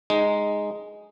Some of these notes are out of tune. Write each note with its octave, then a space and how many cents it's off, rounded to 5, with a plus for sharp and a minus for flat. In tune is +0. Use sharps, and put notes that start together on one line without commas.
G#3 +0 D#4 +0